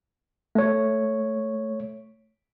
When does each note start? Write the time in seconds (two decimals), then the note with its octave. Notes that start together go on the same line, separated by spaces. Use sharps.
0.55 A3 C#5